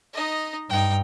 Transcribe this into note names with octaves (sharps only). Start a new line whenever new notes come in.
D#4 D#5
G2 D#4 G5